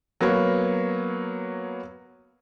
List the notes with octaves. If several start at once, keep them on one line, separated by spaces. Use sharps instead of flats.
F#3 A#3 B3 C#5